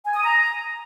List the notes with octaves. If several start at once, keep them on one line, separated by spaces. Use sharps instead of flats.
G#5
D#6
A#5